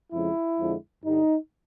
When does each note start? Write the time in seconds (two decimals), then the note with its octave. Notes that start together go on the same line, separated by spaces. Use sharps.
0.12 F2 C#3 F3 G#3 E4
0.58 F2 D3 F3 G#3
1.03 G2 D3 G3 D#4